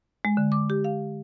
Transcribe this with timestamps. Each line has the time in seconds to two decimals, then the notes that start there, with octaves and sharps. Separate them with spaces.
0.25 G#3
0.37 D3
0.52 D6
0.70 G4
0.84 F5